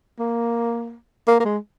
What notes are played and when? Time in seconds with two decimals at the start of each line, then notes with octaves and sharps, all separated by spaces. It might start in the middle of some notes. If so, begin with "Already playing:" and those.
0.19 A#3
1.28 A#3
1.40 A#3
1.45 G#3